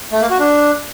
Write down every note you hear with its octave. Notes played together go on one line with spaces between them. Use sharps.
A3
A#3
F#4
D4